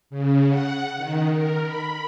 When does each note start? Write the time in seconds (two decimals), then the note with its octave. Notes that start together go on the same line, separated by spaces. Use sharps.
0.10 C#3
0.49 F#5
0.97 D#3
1.32 A#4
1.64 B5